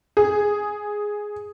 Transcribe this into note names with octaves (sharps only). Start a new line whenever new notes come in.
G#4